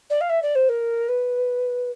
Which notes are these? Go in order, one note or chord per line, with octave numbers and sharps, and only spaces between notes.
D5
F5
E5
D5
C5
A#4
B4